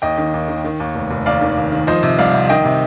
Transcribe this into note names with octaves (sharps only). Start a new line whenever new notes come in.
D#2 D#5 G5
D#3
D#2
D#3
D#3
D#2
F1
F1
D#2 D5 F5
D#3
D#2
D#3
F3 C5 D#5
C3
C2 D5 F5
C2
D#3 D#5 G5
C3